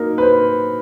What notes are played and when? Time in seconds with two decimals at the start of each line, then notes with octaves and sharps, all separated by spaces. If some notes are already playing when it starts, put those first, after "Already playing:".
Already playing: F#3 A#3 D#4 A#4
0.18 B4
0.22 C5